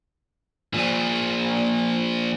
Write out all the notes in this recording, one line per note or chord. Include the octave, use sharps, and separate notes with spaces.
A#2 F3